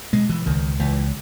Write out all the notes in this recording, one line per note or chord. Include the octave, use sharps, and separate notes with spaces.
B2 G#3
E3
C#2 D#3
C#2 E3